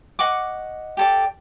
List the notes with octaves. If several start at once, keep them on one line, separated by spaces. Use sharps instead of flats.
D#5 F#5 C#6 D6
G4 A4 D5